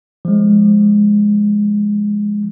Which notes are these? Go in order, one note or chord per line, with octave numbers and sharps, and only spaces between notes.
F3 G#3